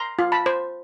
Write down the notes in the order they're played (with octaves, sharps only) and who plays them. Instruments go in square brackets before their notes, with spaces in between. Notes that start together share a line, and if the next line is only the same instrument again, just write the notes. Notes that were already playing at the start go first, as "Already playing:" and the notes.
Already playing: [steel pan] A#5 C6
F4
A5 B5
C5